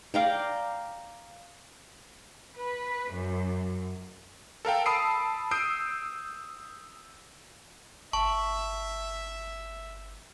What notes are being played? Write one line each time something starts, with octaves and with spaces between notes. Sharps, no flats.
D5 F5 G5 A#5
B4
F#2
A4 A#4 F5 G5
A5 B5 D#6 E6 C7 D7
D#6 E6 G6 C7 D7
G1 E5 A5 C#6